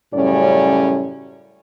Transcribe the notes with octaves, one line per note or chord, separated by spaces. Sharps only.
F#2 A2 C#3 G3 C#4 D5